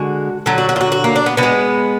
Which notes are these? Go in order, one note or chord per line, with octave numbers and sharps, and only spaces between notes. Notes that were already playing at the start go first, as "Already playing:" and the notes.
Already playing: D3 G#3 F#4
D3 F#3
F#4
F#4
F4
F#4
F#4
A#3
D4
B3
D3 B3
G#3